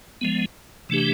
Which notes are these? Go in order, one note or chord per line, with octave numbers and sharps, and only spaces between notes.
F3 G#3 B3
C3 E3 A3 D4 G4